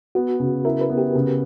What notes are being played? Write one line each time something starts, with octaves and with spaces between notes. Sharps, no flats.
B3 F#4
C#3
E4 A#4
B4
B3
G4
C#3